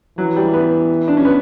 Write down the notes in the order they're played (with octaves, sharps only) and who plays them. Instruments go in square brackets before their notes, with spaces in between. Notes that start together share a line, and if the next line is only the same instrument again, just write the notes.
[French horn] E3 [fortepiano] F#3
[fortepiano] G3
B3
D4
C#4
B3